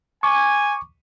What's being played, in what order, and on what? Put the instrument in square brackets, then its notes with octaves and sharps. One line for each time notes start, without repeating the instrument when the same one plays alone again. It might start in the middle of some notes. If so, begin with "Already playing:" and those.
[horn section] G#5 [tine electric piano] C#6 D6